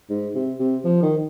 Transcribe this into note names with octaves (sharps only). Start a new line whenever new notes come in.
G#2
C3
C3
F3
D#3